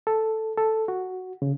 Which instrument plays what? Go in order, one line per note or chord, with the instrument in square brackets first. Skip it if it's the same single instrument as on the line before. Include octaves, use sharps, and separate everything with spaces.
[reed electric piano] A4
A4
F#4
C#3